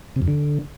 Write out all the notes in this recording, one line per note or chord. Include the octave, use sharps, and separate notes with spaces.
C3
F2
D3